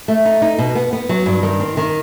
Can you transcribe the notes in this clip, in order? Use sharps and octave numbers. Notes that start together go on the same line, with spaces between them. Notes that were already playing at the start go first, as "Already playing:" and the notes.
A3
D#4
D#4
B2
B3
B3
F#3
G2
D#3
C4
D#3